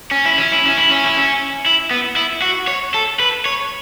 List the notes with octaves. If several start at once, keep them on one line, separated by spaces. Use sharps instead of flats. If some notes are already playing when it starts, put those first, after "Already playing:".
C#4
E4
C#4
E4
C#4
E4
C#4
E4
C#4
E4
B3
E4
F#4
C#5
A4
B4
C#5